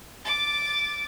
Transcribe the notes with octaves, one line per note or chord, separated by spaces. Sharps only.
D6 A6